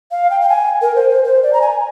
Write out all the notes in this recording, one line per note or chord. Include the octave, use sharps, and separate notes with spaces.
F5
G5
G5
G#5
A#4
C5
C5
C5
D5
A#5
G#5